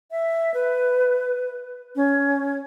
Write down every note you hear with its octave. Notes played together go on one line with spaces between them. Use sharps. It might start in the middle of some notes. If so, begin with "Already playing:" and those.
E5
B4
C#4